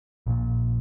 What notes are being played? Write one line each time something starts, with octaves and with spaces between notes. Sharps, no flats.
A#1 A#2